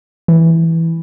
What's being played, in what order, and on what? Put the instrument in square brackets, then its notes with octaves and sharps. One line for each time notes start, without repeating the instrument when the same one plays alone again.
[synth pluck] E3